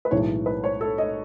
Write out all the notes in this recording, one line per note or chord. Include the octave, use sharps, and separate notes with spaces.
B4
B1 A2 E3 G#3 C#5
B4
C#5
A4
D#5